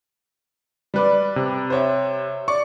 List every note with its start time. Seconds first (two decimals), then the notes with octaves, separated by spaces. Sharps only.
0.94 G3 B4 D5
1.36 C3
1.70 C5 C#5 E5
2.48 D5 C#6